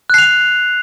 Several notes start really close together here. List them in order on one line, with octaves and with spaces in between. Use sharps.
F#6 C7 F7